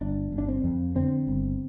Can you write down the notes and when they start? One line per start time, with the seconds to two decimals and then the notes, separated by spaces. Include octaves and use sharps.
0.01 G1 D4
0.32 G1
0.38 D4
0.48 C4
0.64 F2
0.95 D3 C4
1.27 G1